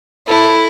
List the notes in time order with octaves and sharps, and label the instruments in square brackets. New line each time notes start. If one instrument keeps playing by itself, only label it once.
[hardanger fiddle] E4 [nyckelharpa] A4